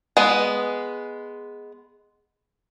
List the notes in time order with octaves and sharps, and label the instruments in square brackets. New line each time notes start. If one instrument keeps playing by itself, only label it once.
[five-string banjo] G#3 B3